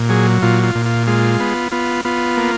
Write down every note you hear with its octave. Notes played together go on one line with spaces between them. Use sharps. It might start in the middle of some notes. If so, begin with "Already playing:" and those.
Already playing: A#2
F#3 G#4
A#2 F4
F4
A#2
F4
G#3 F4
B3
B3 F4
B3 F4
A#3